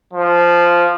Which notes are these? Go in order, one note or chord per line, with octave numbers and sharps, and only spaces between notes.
F3